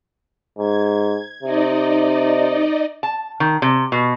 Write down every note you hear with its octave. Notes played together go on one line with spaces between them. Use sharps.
G#2 G#6
C3 D#4 D5 D#5
A5
D#3
C3
B2